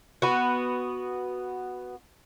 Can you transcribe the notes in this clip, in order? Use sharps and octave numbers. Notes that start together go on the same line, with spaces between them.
B3 F#4